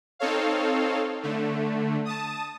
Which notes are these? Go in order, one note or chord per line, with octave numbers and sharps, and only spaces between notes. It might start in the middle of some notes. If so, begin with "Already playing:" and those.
C4 D#4 A4 C#5 F5
D3 A3
A5 D#6